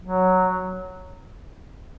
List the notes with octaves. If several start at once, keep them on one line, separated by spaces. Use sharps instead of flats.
F#3